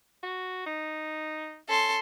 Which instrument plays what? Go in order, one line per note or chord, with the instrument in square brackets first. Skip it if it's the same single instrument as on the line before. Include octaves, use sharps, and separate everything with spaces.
[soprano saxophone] F#4
D#4
[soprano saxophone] C#4 [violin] A4 C6